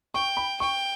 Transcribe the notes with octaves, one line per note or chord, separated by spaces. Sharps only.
G5 C#6
B5
G5 C#6